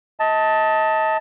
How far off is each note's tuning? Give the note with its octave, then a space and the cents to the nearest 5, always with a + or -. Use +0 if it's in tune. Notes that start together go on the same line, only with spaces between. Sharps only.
D#5 +35 A5 +5